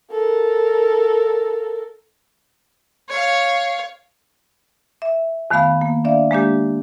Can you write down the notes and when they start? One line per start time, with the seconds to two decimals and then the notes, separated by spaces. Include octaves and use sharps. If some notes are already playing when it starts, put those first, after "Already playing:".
0.12 A4 A#4
3.09 C#5 F5
5.02 E5
5.50 F2 D#3 A3 B3 F5 B5
5.81 A#3
6.05 D4 D5 E5 F5
6.31 G#3 A#3 D4 G4